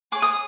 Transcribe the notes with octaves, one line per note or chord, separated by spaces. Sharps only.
G#4 C#5 D6
D#6